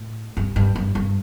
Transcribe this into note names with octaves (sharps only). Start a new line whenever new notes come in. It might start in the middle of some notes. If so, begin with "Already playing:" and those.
Already playing: A2
G2
G2
G2
G2